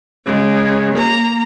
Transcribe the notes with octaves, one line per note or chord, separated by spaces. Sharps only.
C#3 G#3
A#3 A#5